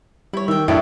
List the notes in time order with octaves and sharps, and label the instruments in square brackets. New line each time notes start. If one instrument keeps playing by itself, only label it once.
[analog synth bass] G3 [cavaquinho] E4 C#5
[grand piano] D#3 [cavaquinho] E5 G5
[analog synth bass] F#2 [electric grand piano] A2 D4 [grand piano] E4 [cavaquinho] G4 A5